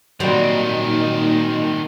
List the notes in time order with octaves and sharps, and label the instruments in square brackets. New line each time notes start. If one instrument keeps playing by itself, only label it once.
[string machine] A#2 D#4 [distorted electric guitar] D#3 C4 [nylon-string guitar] F#3 [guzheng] G3 C5